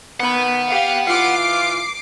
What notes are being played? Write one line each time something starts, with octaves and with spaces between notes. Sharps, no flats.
D#3 B3 F#5 B5
G4 F5
E3 F4 D6 C7